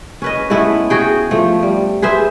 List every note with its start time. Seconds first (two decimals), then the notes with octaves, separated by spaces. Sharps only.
0.22 C#4 B4 D#5
0.50 G#3 A3 B3 E4
0.90 F#4 G#4 G5
1.31 F3 A3
1.63 G3
2.02 G#4 B4 C5 E5